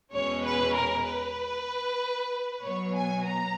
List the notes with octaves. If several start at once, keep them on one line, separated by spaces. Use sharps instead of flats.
E2 B2 G#3 C#4 C#5
B4
A#4
B4
B2 F#3 B3 C#5
G#5
A#5